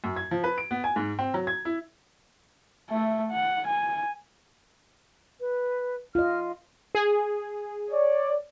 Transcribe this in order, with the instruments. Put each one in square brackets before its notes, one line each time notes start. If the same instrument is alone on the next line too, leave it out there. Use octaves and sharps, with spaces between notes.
[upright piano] F#2
G#6
F3
B4
D7
B3
G#5
G#2
C4
F#3
G#6
E4
[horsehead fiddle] A3 E5
F#5
G#5
[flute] B4
[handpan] F4 D#5 [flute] F6
[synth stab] G#4
[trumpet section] C#5 D5